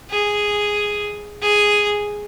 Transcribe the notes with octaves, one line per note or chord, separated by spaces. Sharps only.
G#4
G#4